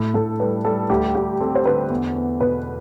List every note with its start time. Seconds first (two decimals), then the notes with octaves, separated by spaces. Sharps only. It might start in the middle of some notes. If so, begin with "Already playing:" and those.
Already playing: A2
0.14 A2 A4
0.40 G3 B4
0.65 G3 A4
0.90 D2 G4
1.15 D2 G4
1.40 C4 A4
1.55 C5
1.65 D3 B4
1.90 E2
2.16 E2
2.40 B2 B4